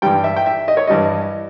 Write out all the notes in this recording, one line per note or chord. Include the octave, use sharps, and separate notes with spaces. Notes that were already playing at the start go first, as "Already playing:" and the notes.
G2 E3 G3 G5
E5
G5
E5
D#5
C#5
G2 E3 G3 D#5